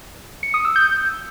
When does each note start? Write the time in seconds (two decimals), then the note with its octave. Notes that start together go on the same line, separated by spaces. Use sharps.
0.43 C#7
0.54 D#6
0.65 E6
0.76 G6